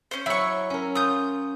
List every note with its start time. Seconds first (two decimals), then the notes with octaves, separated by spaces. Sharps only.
0.11 C#4 C5
0.26 F#3 E4 C#5 C#6
0.70 C#4 A#4
0.95 F4 D#6 G6